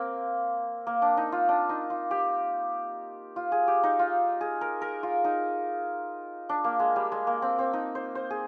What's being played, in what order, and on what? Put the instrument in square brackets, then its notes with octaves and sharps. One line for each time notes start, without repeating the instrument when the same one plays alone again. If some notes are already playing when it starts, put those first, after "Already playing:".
Already playing: [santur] A#3 C4
A#3
D4
D#4
F4
D4
D#4
F4
G4
F4
G#4
G4
D#4
F4
G#4
A#4
A#4
F4
D#4
D4
A#3
G#3
G3
G#3
A#3
C4
C4
D#4
C5
C5
G#4